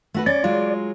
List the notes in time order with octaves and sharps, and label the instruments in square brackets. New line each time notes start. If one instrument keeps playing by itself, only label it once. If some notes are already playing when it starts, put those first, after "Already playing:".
[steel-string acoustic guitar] A3 F#4 B4
[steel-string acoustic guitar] C#4 [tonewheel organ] D5
[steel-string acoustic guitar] F#3 G#3 F4